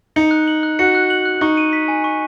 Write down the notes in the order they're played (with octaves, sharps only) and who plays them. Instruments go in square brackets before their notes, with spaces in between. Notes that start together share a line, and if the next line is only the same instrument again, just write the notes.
[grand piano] D#4 [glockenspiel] C#7
[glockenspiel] F#6
F#7
F#6
[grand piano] F#4 [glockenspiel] C#7
[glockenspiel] F#6
F#7
F#6
[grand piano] D#4 [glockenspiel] C#6
[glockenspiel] D#7
B6
G#5
C#6